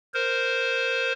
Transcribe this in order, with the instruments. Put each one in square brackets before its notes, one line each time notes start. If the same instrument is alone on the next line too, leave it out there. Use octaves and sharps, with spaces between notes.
[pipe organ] A#4 C5